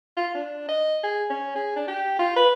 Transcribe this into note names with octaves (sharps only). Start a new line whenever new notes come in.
F4
D4
D#5
G#4
C#4
G#4
D4
G4
F4
B4